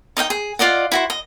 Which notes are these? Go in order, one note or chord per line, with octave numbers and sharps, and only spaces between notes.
D#4 D#5 F5 G5
G#4
F4 D5 D#5 F#5
E4 F#4 C5
D#5